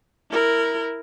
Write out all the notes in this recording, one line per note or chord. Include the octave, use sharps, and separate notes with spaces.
E4 A#4